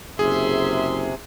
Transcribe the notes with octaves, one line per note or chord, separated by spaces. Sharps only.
F#1 C3 G#4 E5 C6